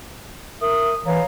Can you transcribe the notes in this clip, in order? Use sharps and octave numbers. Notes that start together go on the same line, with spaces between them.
A#4 E5 D#6
E3 C#5 F5 A#5